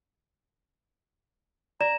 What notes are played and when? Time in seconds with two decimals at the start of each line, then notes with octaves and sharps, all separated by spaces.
1.81 D5 A#5 E7